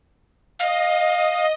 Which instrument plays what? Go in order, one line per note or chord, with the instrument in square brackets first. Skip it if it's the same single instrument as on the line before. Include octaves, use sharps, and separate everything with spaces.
[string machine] D#5 [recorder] F5